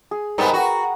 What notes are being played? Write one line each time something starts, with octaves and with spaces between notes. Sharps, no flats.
G#4
G#2 G3 B3 A#4 B4
F#4 F#5 A#5